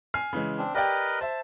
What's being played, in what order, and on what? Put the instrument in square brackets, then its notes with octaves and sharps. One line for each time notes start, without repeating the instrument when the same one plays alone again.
[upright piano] G#5 F6 C7
C#3 E3 G#3
[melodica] C4 D4
[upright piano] G4 D5 G5 [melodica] A#4 B4 D#5
[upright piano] C5 E5 [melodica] A5